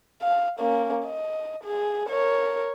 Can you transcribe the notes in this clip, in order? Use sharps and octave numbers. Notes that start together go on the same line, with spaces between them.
F5
A#3 C#4
D#5
G#4
A#4 C#5